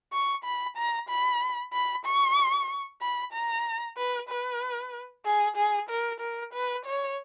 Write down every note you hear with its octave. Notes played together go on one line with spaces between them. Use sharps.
C#6
B5
A#5
B5
B5
C#6
B5
A#5
B4
B4
G#4
G#4
A#4
A#4
B4
C#5